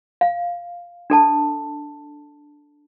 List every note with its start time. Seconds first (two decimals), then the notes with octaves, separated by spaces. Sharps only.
0.21 F5
1.10 D4 A4 A5